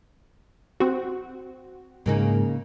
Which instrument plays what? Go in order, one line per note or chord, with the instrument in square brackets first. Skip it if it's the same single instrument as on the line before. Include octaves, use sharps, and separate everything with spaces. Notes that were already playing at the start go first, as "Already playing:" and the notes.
[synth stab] C4 F#4
[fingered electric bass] G#2 G#3 [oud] C#3 A#3 D#4